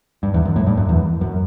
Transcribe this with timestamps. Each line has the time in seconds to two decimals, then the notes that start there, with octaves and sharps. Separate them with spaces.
0.23 G2
0.34 E2
0.45 F#2
0.56 A2
0.67 G2
0.77 F#2
0.89 E2
1.21 F#2